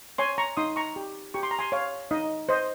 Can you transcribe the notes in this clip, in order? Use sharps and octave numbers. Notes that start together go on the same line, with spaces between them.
C#5 G#5 C6
A#5 C#6
D#4 C6 D#6
A#5 C#6
G4
G4 C#6
C6
A#5
G#5 C6
C#5 F5
D#4 D#5
C5 D#5